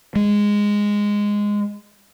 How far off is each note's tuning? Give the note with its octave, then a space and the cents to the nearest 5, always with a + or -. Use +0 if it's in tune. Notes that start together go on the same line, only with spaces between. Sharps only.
G#3 -10